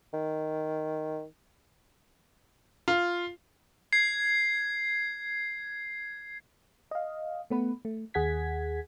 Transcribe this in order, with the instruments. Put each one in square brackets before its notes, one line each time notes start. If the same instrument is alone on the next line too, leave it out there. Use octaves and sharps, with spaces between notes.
[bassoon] D#3
[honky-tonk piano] F4
[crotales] G#6 C7
[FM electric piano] D#5 F5
A3 B3 B4
A3
D#2 G#4 F#5 G#6 B6